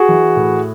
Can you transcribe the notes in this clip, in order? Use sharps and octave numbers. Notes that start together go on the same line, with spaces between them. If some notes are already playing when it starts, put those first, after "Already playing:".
Already playing: F#4 G#4
E3
A2